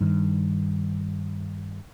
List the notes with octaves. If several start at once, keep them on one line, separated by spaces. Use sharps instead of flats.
G2 D#3